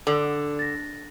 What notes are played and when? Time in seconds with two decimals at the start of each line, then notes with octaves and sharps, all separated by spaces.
0.07 D3 A4 D5
0.59 A6 A#6